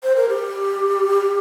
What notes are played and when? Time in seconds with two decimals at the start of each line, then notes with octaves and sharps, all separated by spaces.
0.03 C5
0.16 A#4
0.29 G4